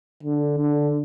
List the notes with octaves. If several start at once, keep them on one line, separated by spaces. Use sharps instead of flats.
D3
D3